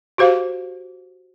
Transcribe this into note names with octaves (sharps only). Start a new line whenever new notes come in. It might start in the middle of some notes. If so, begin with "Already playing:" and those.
F#4 G4 C5 F5